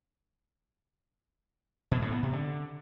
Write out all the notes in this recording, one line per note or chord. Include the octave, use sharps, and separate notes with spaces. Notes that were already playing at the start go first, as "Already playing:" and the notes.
B2
A2
B3
C3
D3